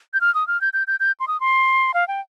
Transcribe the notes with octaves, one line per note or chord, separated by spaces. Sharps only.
G6
F6
D#6
F6
G6
G6
G6
G6
C6
D#6
C6
F5
G5